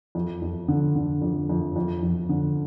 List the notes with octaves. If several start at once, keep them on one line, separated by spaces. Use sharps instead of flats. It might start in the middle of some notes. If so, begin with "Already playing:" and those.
F2
F2
D3
D3
F2
F2
F2
F2
D3